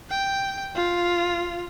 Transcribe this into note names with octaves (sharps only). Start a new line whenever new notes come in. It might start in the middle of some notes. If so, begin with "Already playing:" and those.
G5
F4